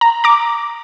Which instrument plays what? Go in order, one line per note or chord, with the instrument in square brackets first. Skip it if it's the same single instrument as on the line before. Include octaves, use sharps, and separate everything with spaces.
[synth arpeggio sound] A#5
A#5 D6